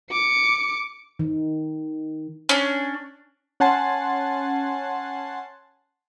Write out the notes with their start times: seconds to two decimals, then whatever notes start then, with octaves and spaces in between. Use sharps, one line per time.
0.11 D6 C#7
1.19 D#3
2.49 C#4 D4
3.60 C#4 F#5 G#5 A5 C6